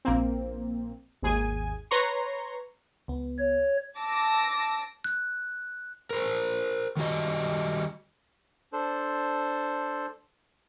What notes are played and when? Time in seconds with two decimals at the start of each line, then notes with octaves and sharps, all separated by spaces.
0.05 A#1 A#3 C4
1.22 G#1 D#2 G#4 G#6 D#7
1.91 B4 C#5 A#5 C6 C#6
3.08 C#2 B3
3.38 C#5
3.99 A5 D6 E6 A#6
5.04 F#6
6.11 A#4 C5
6.97 D#3 G3 F#4 D#5
8.73 D4 A4 C5